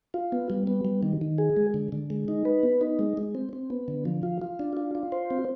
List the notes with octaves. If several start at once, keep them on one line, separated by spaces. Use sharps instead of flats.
F4
B3
G3
B3
G3
D#3
D#3
G#4
G#3
D3
D3
G#3
D#4
B4
B3
D#4
G#3
G#3
C4
C4
B3
D3
F3
F4
F4
D4
F4
F4
C5
C4